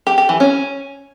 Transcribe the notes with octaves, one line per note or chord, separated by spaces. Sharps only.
G4
G4
E3
C#4